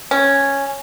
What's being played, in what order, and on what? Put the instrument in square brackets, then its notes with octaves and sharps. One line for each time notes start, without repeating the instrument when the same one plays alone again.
[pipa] C#4